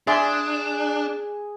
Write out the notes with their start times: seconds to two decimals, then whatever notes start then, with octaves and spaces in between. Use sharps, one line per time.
0.07 D4 G#4 D5 E5 C6